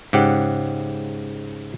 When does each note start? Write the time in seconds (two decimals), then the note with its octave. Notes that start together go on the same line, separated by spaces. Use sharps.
0.13 G#2 C#3 G4 F#5